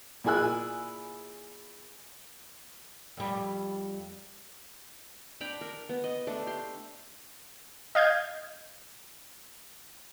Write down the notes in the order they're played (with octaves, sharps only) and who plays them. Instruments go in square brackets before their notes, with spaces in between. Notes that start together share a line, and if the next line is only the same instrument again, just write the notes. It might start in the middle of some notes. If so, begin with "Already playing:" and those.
[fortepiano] A#2 E4 G#4 G#5 E6 F#6
[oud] F2 G3
[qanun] D4 G5 A#5 B5
A#4
B3
D#5
A3 D4
G4 C6
[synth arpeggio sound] D#5 F5 G6 G#6